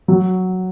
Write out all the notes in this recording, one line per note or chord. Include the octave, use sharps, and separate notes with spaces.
F#3